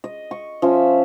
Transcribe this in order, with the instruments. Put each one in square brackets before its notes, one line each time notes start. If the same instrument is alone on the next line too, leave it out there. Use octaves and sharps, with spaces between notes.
[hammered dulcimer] D#5
C#6
F3 C#4 E5